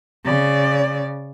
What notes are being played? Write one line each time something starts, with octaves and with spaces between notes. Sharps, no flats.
C#3 D5